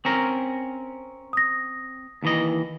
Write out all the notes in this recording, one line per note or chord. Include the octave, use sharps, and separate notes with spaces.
C4 C#4 A#4
D#6 A#6
D#2 E3 D#5